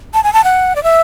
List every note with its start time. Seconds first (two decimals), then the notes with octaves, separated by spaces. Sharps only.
0.14 A5
0.23 G#5
0.33 A5
0.44 F#5
0.75 D5
0.83 E5